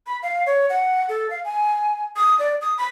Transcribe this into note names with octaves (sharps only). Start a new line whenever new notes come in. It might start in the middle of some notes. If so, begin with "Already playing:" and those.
B5
F5
C#5
F#5
A4
F5
G#5
D#6
D5
D#6
B5